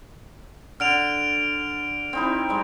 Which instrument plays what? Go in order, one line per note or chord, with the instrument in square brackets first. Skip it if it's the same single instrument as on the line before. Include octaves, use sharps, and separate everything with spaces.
[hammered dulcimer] D3 [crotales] F6 D7 F7
[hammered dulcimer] C4 D#4 E4
G3 G#3